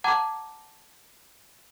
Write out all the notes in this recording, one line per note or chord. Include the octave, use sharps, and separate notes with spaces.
F#5 A5 A#5 D6 G#6